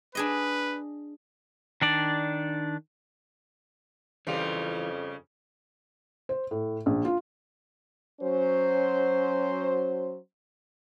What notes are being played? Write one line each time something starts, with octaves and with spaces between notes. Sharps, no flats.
D4 G#4 B4 D#5
D#3 D4 D5
F2 C#3 E3 G3 F4
C5
A2
A#1
F4
F#3 C#4 C5